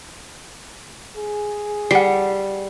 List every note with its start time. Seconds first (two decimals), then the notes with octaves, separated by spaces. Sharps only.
1.17 G#4
1.91 G3 F#5 C7